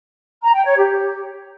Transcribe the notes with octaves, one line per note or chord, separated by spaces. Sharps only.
A#5
G5
C#5
G4